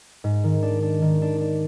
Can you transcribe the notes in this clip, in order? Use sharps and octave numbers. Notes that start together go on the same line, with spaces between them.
G#2
D#3
D4
D4
D#3
D4
D4